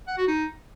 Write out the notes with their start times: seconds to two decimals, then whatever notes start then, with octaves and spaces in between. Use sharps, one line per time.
0.08 F#5
0.18 F#4
0.28 D#4